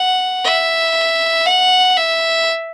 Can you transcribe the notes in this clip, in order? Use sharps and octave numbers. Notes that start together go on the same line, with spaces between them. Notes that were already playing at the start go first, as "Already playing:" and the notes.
Already playing: F#5
E5
F#5
E5